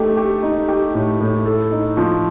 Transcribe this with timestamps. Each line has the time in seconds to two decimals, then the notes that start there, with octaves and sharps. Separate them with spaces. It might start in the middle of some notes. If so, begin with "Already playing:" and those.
Already playing: A3 D#4 G4
0.17 G4
0.42 D#4
0.68 G4
0.94 A2
1.20 A2
1.46 A4
1.72 D#4
1.97 F3